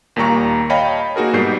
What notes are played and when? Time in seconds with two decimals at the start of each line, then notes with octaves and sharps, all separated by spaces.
0.16 D#2 A#2 G3 A#5 C#6
0.70 C#5 D#5 F5 G5 A5 B5
1.16 A#3 D#4 F#4 G#4 A#4
1.33 G#2 B2 G3 F#4 G6 C7